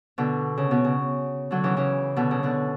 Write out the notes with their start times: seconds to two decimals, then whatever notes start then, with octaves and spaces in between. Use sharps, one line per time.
0.18 B2 D3
0.57 C#3
0.71 B2
0.84 C#3
1.51 D3 F#3
1.64 C#3 E3
1.77 C#3 E3
2.16 B2 D3
2.31 C#3
2.43 B2 D3